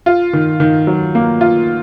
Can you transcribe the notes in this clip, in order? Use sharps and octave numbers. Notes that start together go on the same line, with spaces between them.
F4
D#3
D#3
F#3
A#3
F4